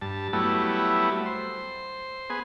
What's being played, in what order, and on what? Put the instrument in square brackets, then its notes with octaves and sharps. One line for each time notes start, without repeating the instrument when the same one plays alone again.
[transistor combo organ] G2 A5
F#3 G3 A3 B3 E4
C5
B3 G#4